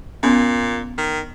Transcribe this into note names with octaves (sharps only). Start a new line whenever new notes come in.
A#2 B3 C#4
D#3